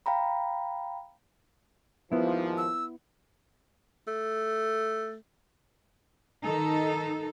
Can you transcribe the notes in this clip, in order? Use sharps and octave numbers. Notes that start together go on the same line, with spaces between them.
F5 G5 A#5 B5
D#2 G#2 F3 B3 E4
E6
A3
D#3 D#4 A4